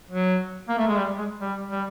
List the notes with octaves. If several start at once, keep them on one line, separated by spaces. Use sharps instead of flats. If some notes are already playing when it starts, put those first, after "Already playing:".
F#3
A#3
A3
G#3
G3
G#3
G3
G3